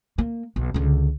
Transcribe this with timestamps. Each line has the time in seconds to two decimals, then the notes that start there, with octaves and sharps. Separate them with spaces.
0.18 A#3
0.56 B1
0.74 C#2 D3